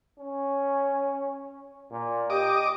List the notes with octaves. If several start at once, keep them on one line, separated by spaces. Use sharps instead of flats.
C#4
A#2
G4 D#5 D6